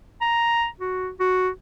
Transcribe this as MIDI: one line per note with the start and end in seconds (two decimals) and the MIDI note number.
0.21 0.67 82
0.80 1.09 66
1.20 1.49 66